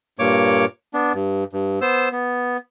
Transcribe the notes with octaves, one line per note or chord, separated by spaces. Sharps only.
G2 A#2 A#3 C#5 D6
B3 D4
G2
G2
B3 C5 E6
B3